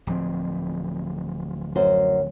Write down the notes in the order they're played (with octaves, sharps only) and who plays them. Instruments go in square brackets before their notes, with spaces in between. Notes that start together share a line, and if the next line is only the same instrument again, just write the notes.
[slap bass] D1 F3 C4
[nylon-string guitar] F#2 F#4 C5